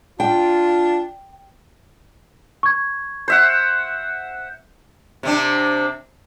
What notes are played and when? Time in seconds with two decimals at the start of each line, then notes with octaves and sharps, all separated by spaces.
0.20 D4 F4 G5
2.63 C#6 G#6
3.28 C5 E5 F#5
5.23 C3 C4 D4